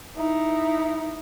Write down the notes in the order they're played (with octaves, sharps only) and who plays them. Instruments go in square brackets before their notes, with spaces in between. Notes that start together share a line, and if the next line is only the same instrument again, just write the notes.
[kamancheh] D#4 E4